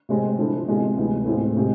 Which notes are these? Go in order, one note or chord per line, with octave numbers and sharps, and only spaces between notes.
C3 G#3 C4
D3 F3 A3 E4
C3 G#3 B3 F4
D2 C3 E3 G#3 B3
A2 G#3 C4 F4
C3 G#3